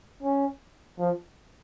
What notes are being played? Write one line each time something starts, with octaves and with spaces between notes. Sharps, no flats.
C#4
F3